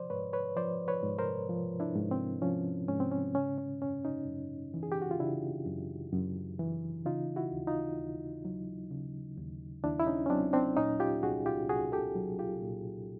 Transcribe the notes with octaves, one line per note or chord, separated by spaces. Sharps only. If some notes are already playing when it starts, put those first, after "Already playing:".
Already playing: F3 C5 D5
G#2 B4 C#5
B4 C#5
F3 C5 D5
B4 C#5
G#2
A#4 C5
F3
D4 E4
G#2
C4
F3 C#4
G#2 C#4
C4
C#4
C#3 C#4
C#4
F#2 C#4
C#4 D#4
F#2
E3
G#4
G4
F#4
F4
C#3 D4 E4
F#2
F#2
E3
C#3 D#4 F4
E4 F#4
D#2
D#4 F4
D#2
F#3
C#3
D#2
D#2 D4 E4
E4
C#4 D#4
C#4
F#3 C4 D4
C4 D4
A#2 C#4 D#4
F4 G4
C2 F#4 G#4
F4 G4
C2 F#4 G#4
G4 A4
F#3
F4 G4
A#2